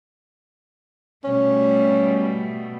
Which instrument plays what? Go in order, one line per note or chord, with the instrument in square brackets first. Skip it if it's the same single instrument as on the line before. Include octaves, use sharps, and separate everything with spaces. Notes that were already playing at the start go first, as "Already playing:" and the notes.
[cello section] B2 G3 A3 [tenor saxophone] C#4